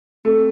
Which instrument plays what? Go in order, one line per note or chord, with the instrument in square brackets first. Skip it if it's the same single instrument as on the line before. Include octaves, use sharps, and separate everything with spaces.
[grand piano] A3 [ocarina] C4